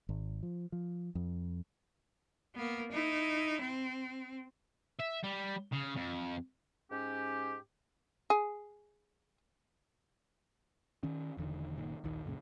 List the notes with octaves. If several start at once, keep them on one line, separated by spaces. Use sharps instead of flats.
G#1
F3
F3
F2
A#3 B3
D#4 E4
C4
E5
G3
C#3
F2
G#2 C#4 G4
G#4
D#3 C#4
E1 E2 D3 D#3
F#1 A#2 D#3
A#1 D#2 D#3
C#2 F#2 A#2 C#3